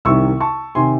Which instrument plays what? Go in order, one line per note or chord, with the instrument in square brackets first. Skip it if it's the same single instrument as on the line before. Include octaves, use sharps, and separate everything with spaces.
[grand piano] C2 C3 D#3 C#6 E6
A5 C#6
C3 D#3 G#5 C6